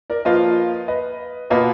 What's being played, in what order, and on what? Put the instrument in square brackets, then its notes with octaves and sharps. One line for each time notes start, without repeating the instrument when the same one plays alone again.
[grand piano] A#4 D5
[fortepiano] F3 A#3 F4 [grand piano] B4 D#5
[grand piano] B4 D#5
[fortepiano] B2 A#3 F4 [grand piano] B4 D#5